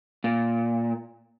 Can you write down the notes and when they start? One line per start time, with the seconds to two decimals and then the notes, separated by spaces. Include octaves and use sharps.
0.24 A#2